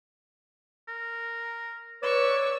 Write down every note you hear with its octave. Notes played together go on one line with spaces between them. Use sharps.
A#4
B4 C#5 D5 C#6 E6